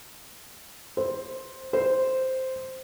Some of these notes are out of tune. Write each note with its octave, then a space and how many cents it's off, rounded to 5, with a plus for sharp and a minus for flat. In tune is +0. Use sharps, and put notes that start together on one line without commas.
C5 +5
C5 -5